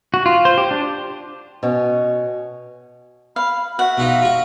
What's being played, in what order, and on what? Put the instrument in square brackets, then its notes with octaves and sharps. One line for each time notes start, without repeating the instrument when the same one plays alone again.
[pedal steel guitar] F#4
F4
C5
G4
D4
[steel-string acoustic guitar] B2 C#4
[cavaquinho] F5 [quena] B5
[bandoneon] F#4 [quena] E5 [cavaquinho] F#5
[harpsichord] B2 D#4 F4
F4 F#4